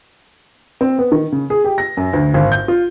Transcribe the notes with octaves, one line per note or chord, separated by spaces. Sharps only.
C4
B3
D#3
C#3
G#4
G4
A#6
F#2
D2
G#1
G6
F4